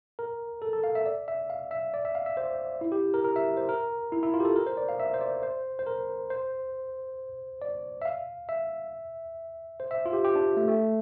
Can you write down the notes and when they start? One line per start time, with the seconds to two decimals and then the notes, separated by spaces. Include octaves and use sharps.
0.19 A#4
0.62 A4
0.73 A4
0.84 F5
0.95 E5
1.06 D5
1.28 E5
1.50 F5
1.71 E5
1.94 D5
2.05 E5
2.15 F5
2.26 E5
2.37 C5
2.81 E4
2.92 G4
3.14 A#4
3.24 A#4
3.36 E5
3.57 C5
3.69 A#4
4.12 E4
4.23 E4
4.34 F4
4.40 G4
4.45 A4
4.56 A#4
4.67 C5
4.77 D5
4.89 F5
5.00 E5
5.14 C5
5.21 D5
5.43 C5
5.79 C5
5.87 A#4
6.30 C5
7.61 D5
8.02 E5
8.05 F5
8.49 E5
9.80 C5
9.91 E5
10.06 F4
10.13 G4
10.24 G4
10.35 D4
10.57 A3
10.68 A3